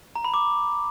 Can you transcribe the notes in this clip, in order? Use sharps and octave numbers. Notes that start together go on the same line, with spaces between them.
A#5
B5
D6